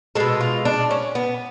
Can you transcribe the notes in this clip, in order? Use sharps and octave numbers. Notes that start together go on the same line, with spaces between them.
B2 G#3 A4
F4
D4
C#4
B3